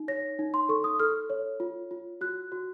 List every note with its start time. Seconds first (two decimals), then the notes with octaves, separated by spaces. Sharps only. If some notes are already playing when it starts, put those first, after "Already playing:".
Already playing: D#4
0.08 C#5 A#6
0.39 D#4
0.54 C6
0.69 A4 C#6
0.84 D#6
1.00 A4 F6
1.30 C#5
1.60 F4
1.91 F4
2.21 F#4 F#6
2.52 F#4